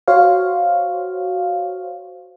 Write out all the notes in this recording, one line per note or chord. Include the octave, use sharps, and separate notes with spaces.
F#4 C5 C#5 F5